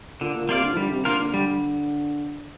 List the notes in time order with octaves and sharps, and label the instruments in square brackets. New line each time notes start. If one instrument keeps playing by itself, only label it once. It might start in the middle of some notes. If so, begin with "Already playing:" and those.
[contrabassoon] A#2 [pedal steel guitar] D3
[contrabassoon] A#2
[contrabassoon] C3 [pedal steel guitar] A#3 F4 D5 F5
[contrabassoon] D3
F3
[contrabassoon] D3 [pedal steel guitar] G3
[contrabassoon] C3
[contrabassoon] D3 [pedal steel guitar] A#3 F4 A#4
[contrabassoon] D3
[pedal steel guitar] G3